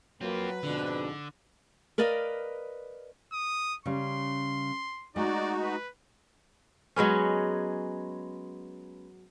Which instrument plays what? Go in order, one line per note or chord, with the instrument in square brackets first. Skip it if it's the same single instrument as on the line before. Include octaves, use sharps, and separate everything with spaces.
[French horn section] F#3 [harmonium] A#3 [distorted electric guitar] C4 F4 [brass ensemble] B4
[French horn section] F2 G#2 [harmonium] B2 D4 [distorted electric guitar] D3
[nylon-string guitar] A#4 B4 D5 D#5 F5
[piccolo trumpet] D#6
[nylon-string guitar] C#3 G3 C#4 [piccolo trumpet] C6
[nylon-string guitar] G#3 A3 G#4 [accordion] D#4 F#4 [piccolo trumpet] D5
[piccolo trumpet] B4
[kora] F#3 G#3 B3 C#4